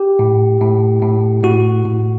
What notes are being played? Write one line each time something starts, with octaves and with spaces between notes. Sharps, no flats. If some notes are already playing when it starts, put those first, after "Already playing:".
Already playing: G4
A2
A2
A2
A2 F#4
A2